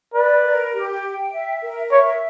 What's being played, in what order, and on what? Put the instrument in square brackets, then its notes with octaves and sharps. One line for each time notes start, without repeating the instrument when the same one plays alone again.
[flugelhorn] B4 [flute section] D5
[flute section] A#4
G4
G5
E5
A#4
[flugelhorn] C#5 [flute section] E5